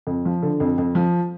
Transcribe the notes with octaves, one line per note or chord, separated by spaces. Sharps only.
F2
F3
D3
F2
F2
F3